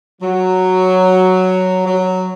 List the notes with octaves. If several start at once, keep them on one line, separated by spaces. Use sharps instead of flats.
F#3
F#3